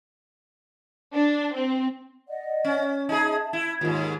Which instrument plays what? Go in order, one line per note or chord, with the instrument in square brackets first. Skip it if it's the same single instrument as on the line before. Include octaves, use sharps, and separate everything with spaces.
[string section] D4
C4
[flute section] D5 D#5 F#5
[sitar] C#4
[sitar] D#4 G#4 [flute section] E5 A5
[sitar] E4
[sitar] D#2 G#2 [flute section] F4 A#4 C#5